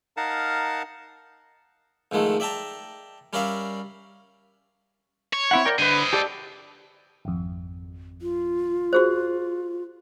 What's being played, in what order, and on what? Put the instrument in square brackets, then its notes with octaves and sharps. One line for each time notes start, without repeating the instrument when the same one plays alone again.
[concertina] D#4 A#4 F5 F#5 A5
[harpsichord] F2 G#2 D#3 G#3 A3
D5 E5 G5 A5 A#5
G3 C#4 A#4 D5 E5 F5
[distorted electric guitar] C#5
[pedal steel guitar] C4 E4 F#5
A#4 D5 G5
[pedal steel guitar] D3 B4 [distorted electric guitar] C5 D#5
[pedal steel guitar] G4 A4 D5
[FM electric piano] G#1 F2
[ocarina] F4
[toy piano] F#4 G#4 C5